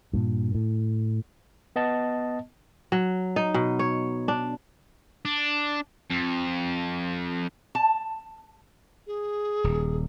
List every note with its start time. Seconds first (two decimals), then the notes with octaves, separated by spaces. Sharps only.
0.13 G2 A#2
0.55 A2
1.76 B3 D#5 A5
2.92 F#3
3.36 D#4
3.54 B2
3.79 C#5
4.28 D4
5.25 D4
6.10 F2
7.75 A5
9.07 G#4
9.64 D#1